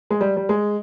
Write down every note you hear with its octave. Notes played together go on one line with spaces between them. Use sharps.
G#3
G3
G3
G#3